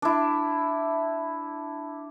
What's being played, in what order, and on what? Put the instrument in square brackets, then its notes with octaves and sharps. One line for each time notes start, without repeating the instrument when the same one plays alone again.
[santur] D4 E4